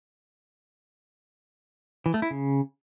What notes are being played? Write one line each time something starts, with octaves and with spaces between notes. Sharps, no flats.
E3
A3
E4
C#3